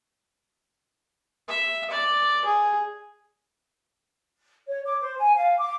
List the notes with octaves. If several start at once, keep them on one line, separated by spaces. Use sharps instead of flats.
E5
D5
G#4
C#5
D6
C5
G#5
F5
D6